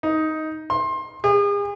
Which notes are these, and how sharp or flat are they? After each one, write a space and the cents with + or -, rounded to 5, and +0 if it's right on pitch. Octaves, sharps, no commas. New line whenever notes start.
D#4 +10
C6 +25
G#4 -40